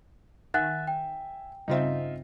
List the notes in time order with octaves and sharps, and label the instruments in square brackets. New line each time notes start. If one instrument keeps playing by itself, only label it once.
[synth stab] D#3 [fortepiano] E5 G#5 [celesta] F#5 F#6 A6
[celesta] G5
[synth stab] G2 C#3 C4 [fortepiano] D#4 F4 E5